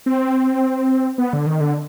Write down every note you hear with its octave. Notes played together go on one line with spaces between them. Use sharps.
C4
B3
D3
D#3
D3